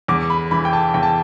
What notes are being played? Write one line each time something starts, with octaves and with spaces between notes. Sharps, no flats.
E2 D6
B5
E3 B5
G5
A5
E2 G5
A5